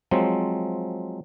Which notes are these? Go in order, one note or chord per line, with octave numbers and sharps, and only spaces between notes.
F3 F#3 G#3 C4